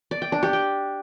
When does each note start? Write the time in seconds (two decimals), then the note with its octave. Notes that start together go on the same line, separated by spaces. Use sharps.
0.11 D5
0.22 G5
0.32 D4
0.43 G4
0.53 G5